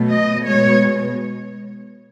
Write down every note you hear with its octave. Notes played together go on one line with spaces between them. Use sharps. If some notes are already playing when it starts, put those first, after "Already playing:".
Already playing: B2 F#3 A3
D#5
B2 G#3 C#5